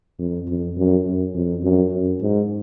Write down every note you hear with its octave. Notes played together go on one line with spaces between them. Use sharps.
F2
F2
F#2
F#2
F2
F#2
F#2
G#2